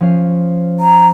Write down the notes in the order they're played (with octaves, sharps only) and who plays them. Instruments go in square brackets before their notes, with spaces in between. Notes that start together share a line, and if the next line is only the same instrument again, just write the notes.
[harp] F3 C#4 F5
[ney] A#5